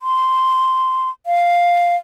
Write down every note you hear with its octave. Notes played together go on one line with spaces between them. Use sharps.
C6
F5